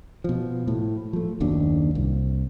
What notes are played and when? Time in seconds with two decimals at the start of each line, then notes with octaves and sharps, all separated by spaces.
0.24 B2 F3
0.67 A2
1.13 F3 A3
1.40 F#1 D#2 F#3 D4
1.95 C2